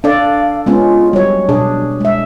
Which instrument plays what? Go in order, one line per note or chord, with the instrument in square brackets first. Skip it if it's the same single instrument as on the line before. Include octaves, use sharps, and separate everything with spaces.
[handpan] D4 A4 D5 [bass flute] F5
[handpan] G#3 B3 C#4 [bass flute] F4
[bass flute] F#3 [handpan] G3 C#5
[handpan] B2 D4 G#4
G#3 E5